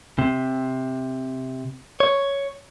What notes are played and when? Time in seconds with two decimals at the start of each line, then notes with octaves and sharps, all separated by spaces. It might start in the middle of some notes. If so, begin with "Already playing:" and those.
0.19 C3
2.00 C#5